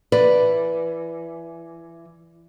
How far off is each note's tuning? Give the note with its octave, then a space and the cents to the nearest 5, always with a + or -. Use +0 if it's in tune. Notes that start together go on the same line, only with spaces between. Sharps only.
E3 +25 B4 +0 D5 +0